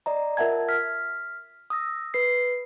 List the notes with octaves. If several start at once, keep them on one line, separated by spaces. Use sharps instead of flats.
D5 D#5 A#5
F4 A#4 E5 F#5 A5 G#6
F6 B6
D#6 E6 A#6
B4 C7